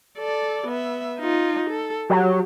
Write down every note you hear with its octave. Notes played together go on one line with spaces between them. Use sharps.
A4 D5
B3 E5
D#4 F4
A4
F#3 G4